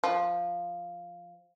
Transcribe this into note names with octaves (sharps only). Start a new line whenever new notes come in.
F3